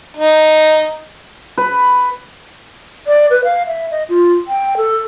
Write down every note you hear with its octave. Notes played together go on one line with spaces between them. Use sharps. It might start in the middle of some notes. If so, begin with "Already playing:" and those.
D#4
B4
D5
B4
F5
E5
D#5
F4
G5
A4